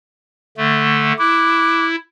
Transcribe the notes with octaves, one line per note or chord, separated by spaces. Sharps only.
D3 A3
E4 D6 F#6